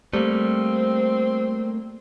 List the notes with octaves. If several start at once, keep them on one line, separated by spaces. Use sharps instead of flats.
G3 A3 A#3 C4